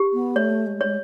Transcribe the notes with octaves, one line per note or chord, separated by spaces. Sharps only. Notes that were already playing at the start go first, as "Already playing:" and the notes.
Already playing: G4
B3
A3 C#5
G#3
G#3 C#5